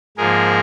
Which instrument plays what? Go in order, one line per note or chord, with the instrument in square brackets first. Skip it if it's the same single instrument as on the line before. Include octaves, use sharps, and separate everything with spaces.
[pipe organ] G#2 F3 A#3 G#4 A#4